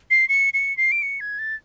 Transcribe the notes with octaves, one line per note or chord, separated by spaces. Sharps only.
C7
C#7
C#7
C7
D7
C#7
G#6
A6